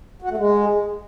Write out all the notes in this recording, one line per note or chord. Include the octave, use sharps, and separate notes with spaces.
F#4
A3
G#3